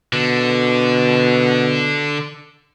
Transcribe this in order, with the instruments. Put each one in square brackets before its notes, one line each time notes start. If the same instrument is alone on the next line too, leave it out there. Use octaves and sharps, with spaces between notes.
[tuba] B2 [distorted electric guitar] D3